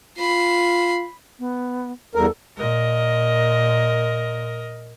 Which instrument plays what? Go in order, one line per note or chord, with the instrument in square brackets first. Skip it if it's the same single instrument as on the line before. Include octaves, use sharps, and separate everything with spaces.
[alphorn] F4 [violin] B5 C7
[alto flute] B3
[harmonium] E2 G2 A#4 [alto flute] A4
[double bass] A#2 [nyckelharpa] A#4 D#5